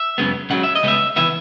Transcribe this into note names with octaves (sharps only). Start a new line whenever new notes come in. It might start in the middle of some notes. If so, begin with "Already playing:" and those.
Already playing: E5
F#2 C#3 G#3 B3
C#2 C#3 F#3 F#5
E5
D#5
C#3 G#3 B3 E5
C#3 E3 B3 E5